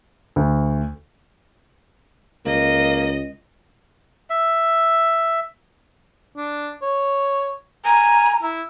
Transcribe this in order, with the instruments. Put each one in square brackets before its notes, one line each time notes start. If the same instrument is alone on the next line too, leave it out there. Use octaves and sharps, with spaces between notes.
[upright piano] D2
[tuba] C#2 [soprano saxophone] A#3 [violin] D#5
[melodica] E5
[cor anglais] D4
C#5
[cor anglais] G#5 [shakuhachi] A#5
[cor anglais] E4